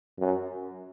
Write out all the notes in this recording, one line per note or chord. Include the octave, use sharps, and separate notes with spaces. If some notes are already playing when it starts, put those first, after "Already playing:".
F#2